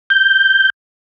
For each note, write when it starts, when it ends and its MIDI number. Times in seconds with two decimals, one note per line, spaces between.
0.10 0.70 91